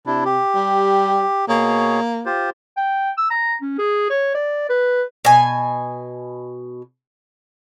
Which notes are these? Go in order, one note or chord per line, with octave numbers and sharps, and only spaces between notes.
C3 D4 E4
G4
G3
B2 A#3 G#4 C#5
F4 G4 C5
G5
E6
A#5
C#4
G#4
C#5
D5
B4
B2 G#5